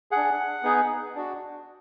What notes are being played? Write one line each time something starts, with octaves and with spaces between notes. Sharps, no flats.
D4 G#4 F#5
B3 D#4 G#4
D4 F#4